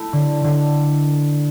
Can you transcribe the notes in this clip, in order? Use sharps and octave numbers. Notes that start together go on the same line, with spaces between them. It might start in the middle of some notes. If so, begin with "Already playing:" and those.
Already playing: A3 E4
D3
D3